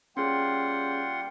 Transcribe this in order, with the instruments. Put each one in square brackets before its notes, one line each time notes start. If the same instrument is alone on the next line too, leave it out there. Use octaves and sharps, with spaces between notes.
[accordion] G3 A#3 G5 [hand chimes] C#4 G#4 [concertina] F4 F#5 C6